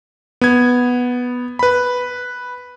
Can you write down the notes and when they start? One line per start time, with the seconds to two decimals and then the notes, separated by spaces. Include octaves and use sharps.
0.41 B3 G#6
1.59 B4 B5